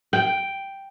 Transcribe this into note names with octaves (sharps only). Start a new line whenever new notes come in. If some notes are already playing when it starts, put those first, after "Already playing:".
G5